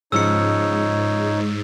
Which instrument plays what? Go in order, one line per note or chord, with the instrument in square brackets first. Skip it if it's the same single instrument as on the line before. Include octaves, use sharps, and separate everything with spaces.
[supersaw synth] G#2 [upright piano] C#3 F3 [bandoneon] D#4 C#5 [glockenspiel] E6 C#7